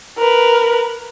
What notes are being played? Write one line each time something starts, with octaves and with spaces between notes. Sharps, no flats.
A#4 B4